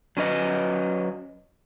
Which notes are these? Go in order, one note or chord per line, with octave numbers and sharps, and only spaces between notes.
F#3 C#4 B4 D#5